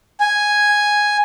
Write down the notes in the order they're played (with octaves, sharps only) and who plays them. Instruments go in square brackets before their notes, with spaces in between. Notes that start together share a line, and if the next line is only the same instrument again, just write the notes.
[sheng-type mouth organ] G#5